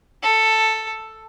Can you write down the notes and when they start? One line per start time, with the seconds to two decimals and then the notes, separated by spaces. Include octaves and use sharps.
0.23 A4